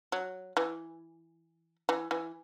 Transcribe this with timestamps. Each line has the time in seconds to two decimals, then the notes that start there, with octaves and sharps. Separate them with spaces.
0.12 F#3
0.57 E3
1.89 E3
2.11 E3